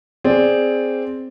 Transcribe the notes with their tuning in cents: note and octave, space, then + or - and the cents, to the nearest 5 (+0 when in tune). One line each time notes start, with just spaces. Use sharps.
C4 +0 G#4 +0 D5 +0